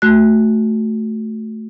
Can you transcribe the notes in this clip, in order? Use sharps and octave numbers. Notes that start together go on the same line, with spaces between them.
A3 F#4 F#6